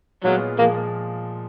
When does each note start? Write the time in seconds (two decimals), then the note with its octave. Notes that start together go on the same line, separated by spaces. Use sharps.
0.24 A#2 F#3 G#3 B3 F4
0.58 A#2 F3 G#3 A#3